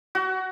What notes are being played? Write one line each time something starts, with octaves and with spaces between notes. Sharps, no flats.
F#4